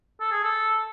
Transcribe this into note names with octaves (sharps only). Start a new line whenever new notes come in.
A4
G#4
A4